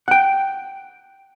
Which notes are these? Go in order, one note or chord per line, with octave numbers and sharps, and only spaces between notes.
F#5 G5